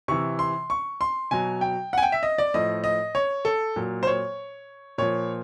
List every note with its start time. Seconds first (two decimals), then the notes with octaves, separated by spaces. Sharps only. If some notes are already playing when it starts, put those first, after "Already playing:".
0.08 C3 E3 C#6
0.39 C6
0.70 C#6
1.01 C6
1.31 B2 F#3 G#5
1.61 G5
1.93 F#5 G#5
2.03 G5
2.12 E5
2.23 D#5
2.38 D5
2.54 A2 F3 D#5
2.84 D#5
3.15 C#5
3.45 A4
3.76 A#2 F#3
4.03 C5
4.07 C#5
4.98 A#2 F3 C#5